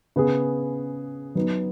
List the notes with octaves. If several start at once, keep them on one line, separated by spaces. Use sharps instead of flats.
C#3 B3 G#4
F#3 B3 D#4